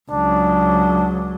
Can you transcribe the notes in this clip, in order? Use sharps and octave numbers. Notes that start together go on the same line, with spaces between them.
C#2 F#3 D4